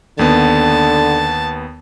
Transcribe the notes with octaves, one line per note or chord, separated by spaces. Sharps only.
D#2 D3 B3 A5